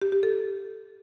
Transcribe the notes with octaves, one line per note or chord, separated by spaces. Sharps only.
G4
G4
A4